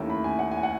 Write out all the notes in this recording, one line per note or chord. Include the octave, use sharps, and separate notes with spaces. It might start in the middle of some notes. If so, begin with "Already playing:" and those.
Already playing: D#2 D#3 A3 C#4 E4
B5
G#5
F#5
G#5
F#5